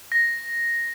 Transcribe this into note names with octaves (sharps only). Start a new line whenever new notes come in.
A#6